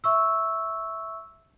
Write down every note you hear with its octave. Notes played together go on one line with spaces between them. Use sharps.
E5 C#6 E6